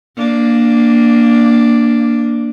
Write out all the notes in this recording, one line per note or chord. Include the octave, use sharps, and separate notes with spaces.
A#3 D4